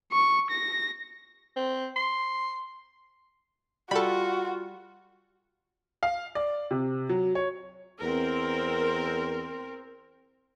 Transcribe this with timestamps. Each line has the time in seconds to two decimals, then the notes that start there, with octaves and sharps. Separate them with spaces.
0.12 C#6
0.50 A#6
1.56 C4
1.96 C6
3.91 G3 F4 F#4 A4 B5
6.03 F5
6.35 D5
6.71 C3
7.09 F#3
7.35 C#5
8.01 E2 C4 A#4